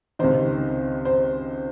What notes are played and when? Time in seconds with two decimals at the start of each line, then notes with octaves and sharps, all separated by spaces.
0.19 C#2 C3 D#3 C5
1.05 C5